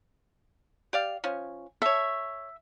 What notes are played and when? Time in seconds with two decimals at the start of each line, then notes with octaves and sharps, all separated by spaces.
0.93 G4 D5 F5
1.24 F3 C#4
1.82 A4 C#5 E5